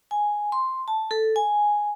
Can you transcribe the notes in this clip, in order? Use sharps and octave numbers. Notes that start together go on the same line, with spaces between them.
G#5
C6
A5
A4
G#5